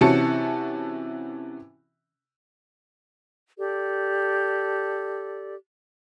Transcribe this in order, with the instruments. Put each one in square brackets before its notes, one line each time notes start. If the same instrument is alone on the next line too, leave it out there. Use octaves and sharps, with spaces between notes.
[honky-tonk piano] C3 E3 C#4 F#4 A5 C#7
[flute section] G4 A4 D5